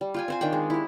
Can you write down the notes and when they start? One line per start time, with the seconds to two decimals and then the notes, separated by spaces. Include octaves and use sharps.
0.01 G3
0.14 F4 G5 G#5
0.28 C4 C5 G#5
0.41 D#3 D4 D5 G5
0.53 G#3
0.70 E4 G4